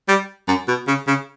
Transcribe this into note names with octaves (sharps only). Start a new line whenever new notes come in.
G3
F#2
B2
C#3
C#3